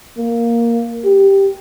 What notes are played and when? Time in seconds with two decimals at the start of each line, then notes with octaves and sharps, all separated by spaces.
0.18 A#3
1.04 G4